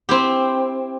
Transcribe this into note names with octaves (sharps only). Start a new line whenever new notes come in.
C4 E4 G4